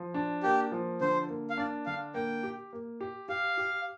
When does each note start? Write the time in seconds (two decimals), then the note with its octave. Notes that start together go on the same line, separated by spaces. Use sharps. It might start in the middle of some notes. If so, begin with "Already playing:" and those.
Already playing: F3
0.14 D4
0.43 A#3 G4
0.72 F3
1.01 D3 C5
1.29 A#3
1.50 F5
1.58 D4 D5
1.86 D3 F5
2.14 A#3 G5
2.43 G4
2.73 A#3
3.01 G4
3.29 G4 F5
3.58 G4